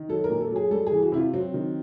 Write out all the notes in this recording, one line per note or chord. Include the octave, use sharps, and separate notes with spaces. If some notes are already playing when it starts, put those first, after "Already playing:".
Already playing: D#3
F#3 A4
A#4
A#2
A4
F#3 G#4
G3 A4
E3 G#4
F#4
C3 E4
F4
F#3 C4
D#3